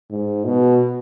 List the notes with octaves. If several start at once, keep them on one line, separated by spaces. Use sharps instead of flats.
G#2
B2